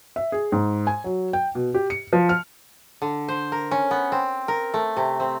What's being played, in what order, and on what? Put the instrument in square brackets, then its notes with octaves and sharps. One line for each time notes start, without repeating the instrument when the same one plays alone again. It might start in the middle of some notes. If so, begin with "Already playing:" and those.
[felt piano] E5
G#4
G#2
G#5
F#3
G5
B2
G4
C#7
F3
F6
[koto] D3
C5
A#4
C#4
B3
C4
A#4
A3
C3
C4